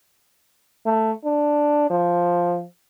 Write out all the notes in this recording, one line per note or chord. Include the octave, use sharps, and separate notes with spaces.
A3
D4
F3